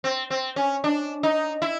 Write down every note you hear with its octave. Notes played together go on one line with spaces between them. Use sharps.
C4
C4
C#4
D4
D#4
E4